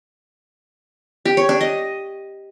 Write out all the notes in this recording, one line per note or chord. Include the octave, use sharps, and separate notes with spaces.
G4
C#5
D4
D#5